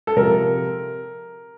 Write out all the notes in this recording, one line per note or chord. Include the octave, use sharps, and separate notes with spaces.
A4
C3 F3 A#4